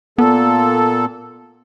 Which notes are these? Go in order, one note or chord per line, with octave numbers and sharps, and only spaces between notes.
A#2 B3 A4